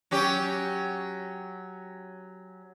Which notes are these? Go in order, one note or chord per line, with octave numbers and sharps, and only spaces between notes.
F#3 C#4 G4